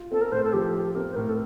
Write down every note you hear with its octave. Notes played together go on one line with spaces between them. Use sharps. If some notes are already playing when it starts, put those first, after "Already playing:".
Already playing: F4
C4 A4
A#4
A2 C5
A4
F3 G4
F4
C4 A#4
C5
A2 A#4
A4